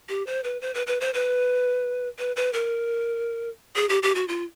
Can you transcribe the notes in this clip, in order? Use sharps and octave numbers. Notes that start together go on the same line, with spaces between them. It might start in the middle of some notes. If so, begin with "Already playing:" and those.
G4
C5
B4
C5
B4
B4
C5
B4
B4
B4
A#4
G#4
G4
G4
F#4
F4